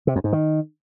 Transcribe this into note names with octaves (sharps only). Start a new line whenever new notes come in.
C3
F2
G#2
D#3